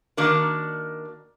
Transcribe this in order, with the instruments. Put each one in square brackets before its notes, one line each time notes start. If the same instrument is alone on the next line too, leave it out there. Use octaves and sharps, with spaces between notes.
[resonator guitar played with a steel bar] D#3 A#3 D4 F#4 A#4